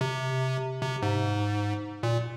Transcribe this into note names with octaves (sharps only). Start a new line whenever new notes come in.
C3
C3
G#2
A#2